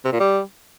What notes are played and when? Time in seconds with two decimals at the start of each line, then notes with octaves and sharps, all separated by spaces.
0.05 C3
0.12 A#2
0.20 G3